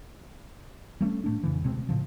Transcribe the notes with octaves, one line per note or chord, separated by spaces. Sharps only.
G3 A3 C4 C#4
A2 A3 D4
F2 C#3 E3
D2 B2 G#3 C4
A2 C#3 F3